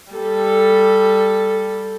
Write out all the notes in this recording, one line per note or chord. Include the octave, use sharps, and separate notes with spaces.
G3 A4